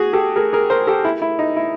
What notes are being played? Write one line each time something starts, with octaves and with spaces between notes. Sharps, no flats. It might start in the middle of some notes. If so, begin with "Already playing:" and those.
Already playing: F#4 G#4
G4 A4
G#4 A#4
G#4 A#4
A#4 C5
G4 A4
E4
E4
D#4
E4